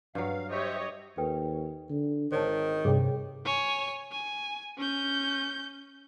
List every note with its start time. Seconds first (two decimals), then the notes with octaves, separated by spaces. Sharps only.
0.15 G2 F#3 F5
0.50 G4 C5 C#5 D#5 E5
1.18 D#2 A4 B4 G5
1.90 D3
2.32 G#1 D#3 C5 C#5 A5
2.85 G2 C3 G#4 C#5 G5
3.45 C#5 G#5
4.12 G#5
4.78 C#4 G6